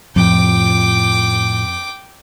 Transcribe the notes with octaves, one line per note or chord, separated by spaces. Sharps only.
F2 A2 F3 G5 D6